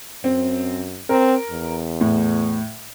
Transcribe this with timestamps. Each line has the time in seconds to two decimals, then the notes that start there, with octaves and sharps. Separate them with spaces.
0.24 F#2 C4
1.09 C4 A#4
1.51 E2
2.01 A2